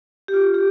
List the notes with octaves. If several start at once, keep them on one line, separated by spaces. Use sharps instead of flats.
G4
F4
G4